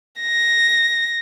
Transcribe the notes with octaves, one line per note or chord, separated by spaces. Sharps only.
A#6